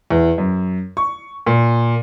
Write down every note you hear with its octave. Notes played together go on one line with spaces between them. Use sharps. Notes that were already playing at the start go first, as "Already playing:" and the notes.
E2
F#2
C#6
A#2